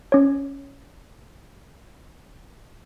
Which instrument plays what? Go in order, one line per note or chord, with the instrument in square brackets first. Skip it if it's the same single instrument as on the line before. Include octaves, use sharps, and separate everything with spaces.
[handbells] C#4 C#5